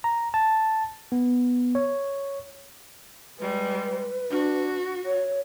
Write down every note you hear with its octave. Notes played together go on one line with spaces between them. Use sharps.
A#5
A5
B3
C#5
G3 G#3 B4
D4 F#4
C#5